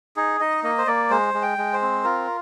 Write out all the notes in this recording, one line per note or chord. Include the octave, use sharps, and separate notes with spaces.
D#4 G#4
D#4 D#5
A#3 D#5
C5
A#3 D5
G#3 C5
G#3
G5
G#3
C5
C4
F4 A#4